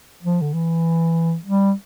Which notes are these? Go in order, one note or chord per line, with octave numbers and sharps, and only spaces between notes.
F3
D3
E3
G3